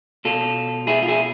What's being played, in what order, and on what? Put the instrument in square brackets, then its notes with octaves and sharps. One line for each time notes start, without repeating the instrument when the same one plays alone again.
[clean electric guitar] B2 F4 A4
E4 G#4
F4
E4 G#4